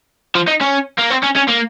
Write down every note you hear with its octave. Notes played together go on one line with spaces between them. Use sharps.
F3
D#4
C#4
A#3
C4
C#4
C#4
A#3